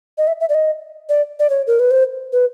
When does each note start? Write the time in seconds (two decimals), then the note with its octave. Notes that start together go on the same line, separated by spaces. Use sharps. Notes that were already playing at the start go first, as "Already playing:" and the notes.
0.18 D#5
0.27 E5
0.41 E5
0.49 D5
0.54 D#5
1.09 D5
1.39 D5
1.50 C#5
1.67 A#4
1.80 B4
1.91 C5
2.33 B4